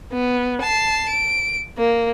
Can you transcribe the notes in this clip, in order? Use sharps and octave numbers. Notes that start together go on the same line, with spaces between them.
B3
A5 C7
D7
A#3